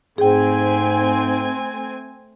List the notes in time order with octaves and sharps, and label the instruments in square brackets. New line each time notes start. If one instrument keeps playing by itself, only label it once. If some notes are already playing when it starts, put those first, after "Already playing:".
[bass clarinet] G#2 [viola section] A3 C4 G#5 [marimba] G#4 G5